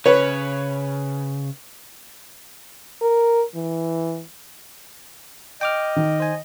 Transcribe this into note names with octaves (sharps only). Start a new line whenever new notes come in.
C#3 B4 C#5
A#4
E3
D#5 G5 D6 F6
D#3
C5 G#5